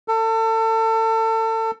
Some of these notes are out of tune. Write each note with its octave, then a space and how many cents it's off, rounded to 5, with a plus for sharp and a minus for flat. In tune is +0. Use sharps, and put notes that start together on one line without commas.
A4 +30